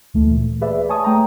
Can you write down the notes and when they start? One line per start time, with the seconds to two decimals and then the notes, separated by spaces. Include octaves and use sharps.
0.14 D2 E3 A3
0.31 A#2
0.61 G#4 B4 D5 E5
0.89 C#5 G#5 A5 C#6 D#6
1.04 A3 G5 A#5